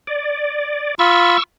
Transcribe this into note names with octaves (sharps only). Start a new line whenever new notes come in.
D5
F4 B5 C#6 E6